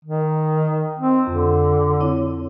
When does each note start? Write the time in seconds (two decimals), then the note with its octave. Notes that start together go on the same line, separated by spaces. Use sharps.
0.05 D#3
0.99 C4
1.27 F2 D3
2.01 C4 E4 C#5